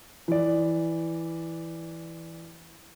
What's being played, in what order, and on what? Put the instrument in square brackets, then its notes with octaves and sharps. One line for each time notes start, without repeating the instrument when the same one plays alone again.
[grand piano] E3 D5